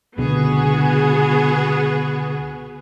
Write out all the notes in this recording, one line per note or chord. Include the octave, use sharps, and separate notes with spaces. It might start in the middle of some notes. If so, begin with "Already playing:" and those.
C#2 B2 D3 B3 F#4 G#4